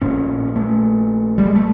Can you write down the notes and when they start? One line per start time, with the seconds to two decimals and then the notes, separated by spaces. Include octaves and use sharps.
0.01 A#1 A#2 C#4
0.56 A3
1.38 G3
1.46 G#3
1.55 A3